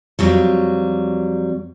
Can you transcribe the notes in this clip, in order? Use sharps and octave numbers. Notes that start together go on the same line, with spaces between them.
F2 F#3 G3